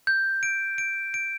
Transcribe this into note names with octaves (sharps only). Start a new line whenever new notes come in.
G6
D7
D7
D7